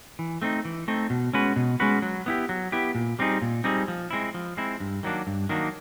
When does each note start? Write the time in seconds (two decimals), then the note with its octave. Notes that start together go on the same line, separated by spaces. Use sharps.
0.19 E3
0.42 A3 C4 D#4
0.65 E3
0.88 A3 C4 D#4
1.10 B2
1.33 G#3 C#4 F#4 B4
1.56 B2
1.80 G#3 C#4 F#4 B4
2.02 F#3
2.26 B3 E4 G4
2.49 F#3
2.72 B3 E4 G4
2.95 A#2
3.19 G3 C4 D#4 G#4
3.42 A#2
3.64 G3 C4 D#4 G#4
3.88 F3
4.11 G#3 C4 E4
4.34 F3
4.57 G#3 C4 E4
4.80 G2
5.03 D#3 F#3 A#3 D4
5.27 G2
5.49 D#3 F#3 A#3 D4